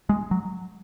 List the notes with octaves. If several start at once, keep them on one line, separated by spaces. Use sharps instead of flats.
G#3
F#3